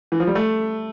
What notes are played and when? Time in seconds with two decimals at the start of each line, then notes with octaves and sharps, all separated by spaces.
0.12 E3
0.20 F3
0.27 G3
0.35 A3